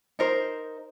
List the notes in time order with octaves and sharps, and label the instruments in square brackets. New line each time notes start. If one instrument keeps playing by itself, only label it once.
[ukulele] D#4 A#4 C5